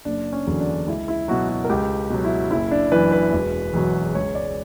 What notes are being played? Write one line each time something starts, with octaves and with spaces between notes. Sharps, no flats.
F#1 D4
C#4
E2 D3 F#3
D4
C#2 E4
E4
B2 F#3 F#4
F#4
A#4
C#2 G4
B2 F#3
E4
F#1 E4
D4
F#2 E3 B4
B4
E1
E2 B2 F#3
C#2 C#5
D5